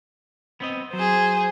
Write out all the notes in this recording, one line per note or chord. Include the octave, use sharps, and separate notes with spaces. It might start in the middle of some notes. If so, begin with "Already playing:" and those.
B3 C4 D#5
F#3 G#4 C5